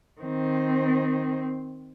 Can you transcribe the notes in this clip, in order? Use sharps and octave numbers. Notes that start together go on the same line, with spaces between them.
D#3 C4